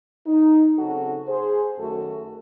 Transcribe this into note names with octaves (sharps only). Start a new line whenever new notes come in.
D#4
C#3 F#3 C4 F#4 A4
G#4 C5
F#2 D#3 F#3 A3 F#4 A4